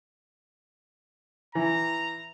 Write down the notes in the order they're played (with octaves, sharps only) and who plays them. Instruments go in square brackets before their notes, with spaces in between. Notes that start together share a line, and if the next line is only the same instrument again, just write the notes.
[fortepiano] E3 [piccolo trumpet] A#5